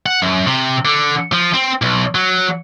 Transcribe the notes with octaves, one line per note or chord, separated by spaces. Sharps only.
F#5
F#2
C3
D3
F3
C4
B1
F#3